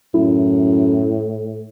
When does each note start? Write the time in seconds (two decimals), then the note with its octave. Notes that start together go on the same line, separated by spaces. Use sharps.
0.14 F#2 A2 E4